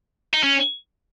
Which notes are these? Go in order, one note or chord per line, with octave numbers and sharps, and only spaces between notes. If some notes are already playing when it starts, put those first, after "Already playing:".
D#4
C#4